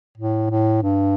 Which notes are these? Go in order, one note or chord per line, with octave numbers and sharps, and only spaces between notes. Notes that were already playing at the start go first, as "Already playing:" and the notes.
A2
A2
G2